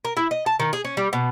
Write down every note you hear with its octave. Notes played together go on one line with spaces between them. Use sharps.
A#4
E4
D#5
A5
D#3
G#4
C#4
G3
B2